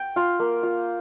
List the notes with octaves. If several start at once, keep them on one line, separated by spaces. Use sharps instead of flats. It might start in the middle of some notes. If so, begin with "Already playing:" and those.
Already playing: G5
F4
A#3
F4